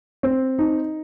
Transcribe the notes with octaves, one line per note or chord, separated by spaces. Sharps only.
C4
D#4